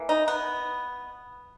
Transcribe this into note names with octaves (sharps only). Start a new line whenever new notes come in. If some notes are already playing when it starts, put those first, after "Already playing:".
Already playing: E3 A#3
D#4
B3